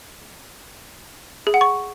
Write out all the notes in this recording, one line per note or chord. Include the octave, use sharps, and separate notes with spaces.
G#4
F#5
C#6